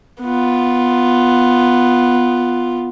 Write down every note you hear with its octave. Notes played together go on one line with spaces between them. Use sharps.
B3 F4